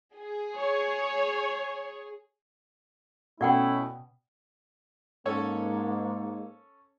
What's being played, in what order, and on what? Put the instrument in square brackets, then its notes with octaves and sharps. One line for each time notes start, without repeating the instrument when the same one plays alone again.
[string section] G#4
[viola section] C#5
[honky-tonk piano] B2 [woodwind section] A3 E4 [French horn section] C#4 [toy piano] D5 F#5 G5
[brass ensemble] G#2 A#3 [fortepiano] C#4 A4 C#5